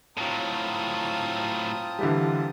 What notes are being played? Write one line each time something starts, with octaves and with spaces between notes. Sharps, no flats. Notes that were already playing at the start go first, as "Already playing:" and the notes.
A2 F#3 C4 F4 A5 A#5 D#6
D3 E3 G3